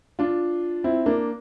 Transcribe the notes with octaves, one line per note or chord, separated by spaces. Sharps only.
D4 F4
C4 E4
A#3 D4